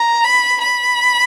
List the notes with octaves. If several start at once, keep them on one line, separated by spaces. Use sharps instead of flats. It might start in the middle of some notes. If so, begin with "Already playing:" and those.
Already playing: A#5
B5
B5